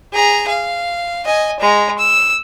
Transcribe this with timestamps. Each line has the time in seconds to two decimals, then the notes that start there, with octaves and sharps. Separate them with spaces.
0.13 G#4 A#5
0.48 F5
1.25 D#5 G#5
1.60 G#3 A#5
1.98 E6